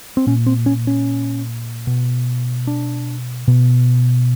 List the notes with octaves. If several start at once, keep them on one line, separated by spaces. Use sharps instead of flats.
C4
A#2 C#4
C4
C#4
C#4
B2
D4
B2